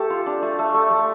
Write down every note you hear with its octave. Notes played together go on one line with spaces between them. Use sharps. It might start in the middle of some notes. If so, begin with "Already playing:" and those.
Already playing: A3 G4 A4
F4
D4
A3
A3
A3
A3